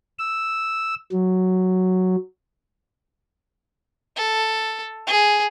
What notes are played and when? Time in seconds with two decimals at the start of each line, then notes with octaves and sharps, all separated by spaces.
0.19 E6
1.12 F#3
4.16 A4
5.07 G#4